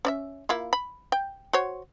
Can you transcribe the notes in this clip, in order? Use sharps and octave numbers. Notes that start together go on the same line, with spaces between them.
C#4 D5 E5
A#3 E4 F4
B5
G5
F#4 C5 C#5